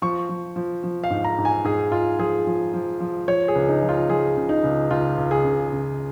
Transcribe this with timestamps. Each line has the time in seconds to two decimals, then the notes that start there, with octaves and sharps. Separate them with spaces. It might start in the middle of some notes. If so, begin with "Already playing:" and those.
0.02 F3 C#6
0.29 F3
0.56 F3
0.83 F3
1.04 F5
1.10 G#2
1.24 A#5
1.38 G#2
1.45 G#5
1.64 G#2 G#4
1.91 G#2 F4
2.19 F3 G#4
2.47 F3
2.74 F3
3.00 F3
3.28 F3 C#5
3.48 G#4
3.55 C#2
3.69 D#4
3.82 F3
3.89 F4
4.09 F3 G#4
4.37 C#3
4.49 D#4
4.63 C#2
4.90 C#2 F4
5.18 C#2
5.31 G#4
5.44 C#3
5.72 C#3